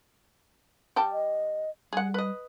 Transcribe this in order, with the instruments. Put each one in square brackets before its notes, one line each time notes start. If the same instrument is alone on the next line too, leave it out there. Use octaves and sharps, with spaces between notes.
[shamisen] G3 G5 A5
[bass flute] D#5
[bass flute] G3 [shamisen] G#4 F#5
[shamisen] B4 D#5